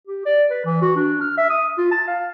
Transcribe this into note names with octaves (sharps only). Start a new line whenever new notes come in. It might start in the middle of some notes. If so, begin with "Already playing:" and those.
G4
D5
B4
E3
F#4
D4
F6
E5
D#6
F4
A5
F5